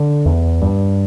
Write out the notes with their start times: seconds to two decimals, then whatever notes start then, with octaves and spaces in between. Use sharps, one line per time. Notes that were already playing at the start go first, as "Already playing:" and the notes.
Already playing: D3
0.26 E2
0.62 G2